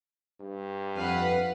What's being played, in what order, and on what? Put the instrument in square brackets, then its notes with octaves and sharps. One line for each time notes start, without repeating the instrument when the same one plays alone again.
[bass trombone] G2
[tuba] F2 [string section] B4 [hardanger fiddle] F5 F#5